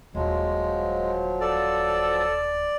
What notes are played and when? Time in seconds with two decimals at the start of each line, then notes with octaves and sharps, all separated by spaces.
0.15 D#1 F3 F#3 G#3
1.41 A4 D5